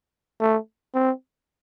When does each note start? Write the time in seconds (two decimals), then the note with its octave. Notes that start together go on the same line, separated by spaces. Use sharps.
0.40 A3
0.94 C4